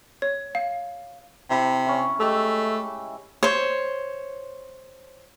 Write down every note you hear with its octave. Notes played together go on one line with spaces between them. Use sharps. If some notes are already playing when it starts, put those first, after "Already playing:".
C#5
F5
C3 E4
C#4 E4
G#3 A3 G4 E6
C5 C#5